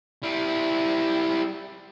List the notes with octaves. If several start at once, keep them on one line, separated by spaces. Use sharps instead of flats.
G3 E4